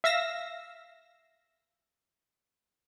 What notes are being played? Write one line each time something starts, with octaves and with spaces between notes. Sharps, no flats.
E5 F5 E6 A#6